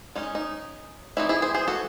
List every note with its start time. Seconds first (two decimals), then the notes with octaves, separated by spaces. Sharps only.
0.15 G#3 C#4 D#4
0.35 D#4
1.17 E3 C4 D#4 E4
1.29 E4 G#4
1.42 G#4 C5
1.54 G#4 C5
1.68 F#4 A4